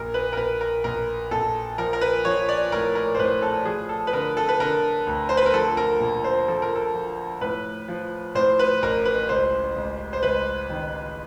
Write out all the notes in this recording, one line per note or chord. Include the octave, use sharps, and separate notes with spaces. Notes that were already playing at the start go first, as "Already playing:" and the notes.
Already playing: A#1 A#4
B4
A#4
A#1 B4
A#4
A#1 A#4
A#1 A4
F3 A#4
A#4
B4
F3 C#5
D5
A2 A#4
A#4
C5
A2 B4
A4
F3 G#4
A4
B4
D3 A#4
A4
B4
D3 A#4
D2
C5
B4
A#4
F3 A4
A4
A#4
A#2
C5
F3 A4
A#4
A4
F3
A2 B4
F3
A2 C5
B4
A1 A#4
B4
C#2 C5
C#2
C5
C#2 B4
D#3